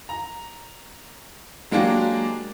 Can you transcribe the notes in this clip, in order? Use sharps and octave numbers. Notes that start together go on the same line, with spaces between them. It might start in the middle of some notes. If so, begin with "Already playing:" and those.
A#5
F#3 G#3 A#3 D4 G4